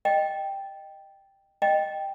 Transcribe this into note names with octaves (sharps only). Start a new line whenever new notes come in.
D#5 G5
D#5 G5